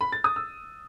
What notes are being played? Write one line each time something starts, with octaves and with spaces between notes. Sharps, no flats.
B5
A6
D#6
E6